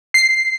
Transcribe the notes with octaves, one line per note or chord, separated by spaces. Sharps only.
C7